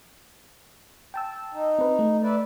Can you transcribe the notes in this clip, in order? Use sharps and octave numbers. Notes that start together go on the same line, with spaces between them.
G5 A5 E6
D#4
C4 B4
A3
B4 D5 E5